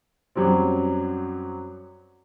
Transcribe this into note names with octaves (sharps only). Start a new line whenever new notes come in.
F#2 F#3 G3 C4